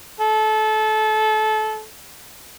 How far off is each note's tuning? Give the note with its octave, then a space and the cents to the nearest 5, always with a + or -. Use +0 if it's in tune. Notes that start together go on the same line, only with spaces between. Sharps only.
A4 -25